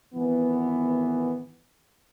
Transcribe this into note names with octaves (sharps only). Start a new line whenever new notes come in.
G#1 E3 B3